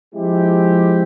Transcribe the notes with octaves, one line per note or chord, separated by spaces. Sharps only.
F3 G#3 C4 E4 G4